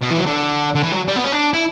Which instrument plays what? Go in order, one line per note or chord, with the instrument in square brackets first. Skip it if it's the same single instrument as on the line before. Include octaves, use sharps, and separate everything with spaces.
[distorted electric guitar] B2
E3
F#3
D3
D3
E3
F#3
G3
B3
C#4
D4
E4